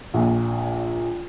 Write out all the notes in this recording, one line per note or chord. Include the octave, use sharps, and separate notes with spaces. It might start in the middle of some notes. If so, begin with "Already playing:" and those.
A#1 A#2